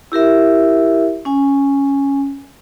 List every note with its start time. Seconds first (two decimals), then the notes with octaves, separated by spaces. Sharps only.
0.12 E4 G4 A#4 E5
1.25 C#4 G#5